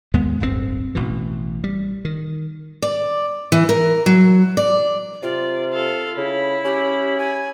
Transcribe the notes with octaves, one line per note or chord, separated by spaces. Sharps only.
D#2 G#3 B3
D1 G1 G2 C4
A1 B2 E3
G3
D#3
D5
E3
A#4
F#3
D5
C3 F4 D5
A4 F5
C#3 E4 B5
C#4 G4
G#5